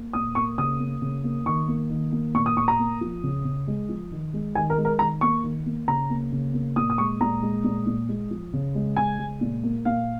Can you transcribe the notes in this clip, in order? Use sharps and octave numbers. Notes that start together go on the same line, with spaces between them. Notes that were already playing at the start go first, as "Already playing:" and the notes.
Already playing: A#3
A#2 D#6
A#3 C#6
C#3 D#6
A#3
C#3
A#3
D#3 C#6
A#3
D#3
A#3
A#2 C#6
D#6
A#2 C#6
A#5
A#3
F3
C#3
C#3
G#3
F3
D#3
G#3
D#3 G#5
A#4
G#3
A#4
D#3 A#5
A#3 C#6
D#3
A#3
C#3 A#5
A#3
C#3
A#3
A#2 D#6
D#6
G#3 C#6
A#2 A#5
G#3
A#2
A#2
G#3
F3
C#3
G#3
C#3 G#5
G#3
A#2
A#3
A#2 F5